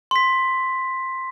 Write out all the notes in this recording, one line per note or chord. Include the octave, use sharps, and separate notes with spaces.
C6 B6